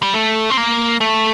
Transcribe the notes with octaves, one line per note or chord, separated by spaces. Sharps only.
G3
A3
C4
A#3
A3